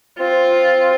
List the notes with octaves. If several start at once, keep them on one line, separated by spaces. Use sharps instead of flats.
C4 F4